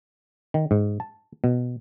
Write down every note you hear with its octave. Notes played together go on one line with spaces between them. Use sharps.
D#3
G#2
A5
B2